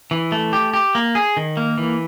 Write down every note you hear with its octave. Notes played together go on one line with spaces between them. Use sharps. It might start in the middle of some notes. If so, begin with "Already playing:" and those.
E3
A3
G4
G4
A#3
G#4
D#3
A#3
E3